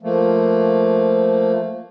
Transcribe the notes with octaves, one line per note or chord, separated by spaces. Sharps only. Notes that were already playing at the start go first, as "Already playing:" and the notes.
F3 A3 A#3